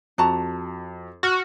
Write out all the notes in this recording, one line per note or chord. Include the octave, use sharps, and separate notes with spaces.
F2 F#4 A5 A#5
F#4 C#6 F6